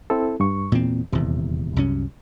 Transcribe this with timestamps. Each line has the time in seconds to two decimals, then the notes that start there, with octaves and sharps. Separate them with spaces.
0.10 C4 E4 A4
0.40 G2 C#6
0.72 E2 A#2 C4
1.12 D#1 E2 C3
1.76 C2 F#2 C#4